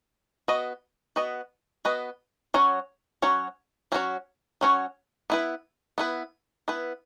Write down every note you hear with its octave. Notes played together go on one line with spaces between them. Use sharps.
B3 F#4 B4 D#5
B3 F#4 B4 D#5
B3 F#4 B4 D#5
F#3 C#4 F#4 C#5
F#3 C#4 F#4 C#5
F#3 C#4 F#4 C#5
F#3 C#4 F#4 C#5
B3 E4 B4
B3 E4 B4
B3 E4 B4